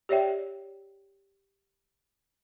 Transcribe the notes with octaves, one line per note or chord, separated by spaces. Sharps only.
G4 C#5 D5 E5 G5